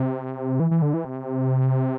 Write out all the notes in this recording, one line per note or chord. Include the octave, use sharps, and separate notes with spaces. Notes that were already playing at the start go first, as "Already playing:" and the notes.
Already playing: C3
E3
E3
D3
E3
C3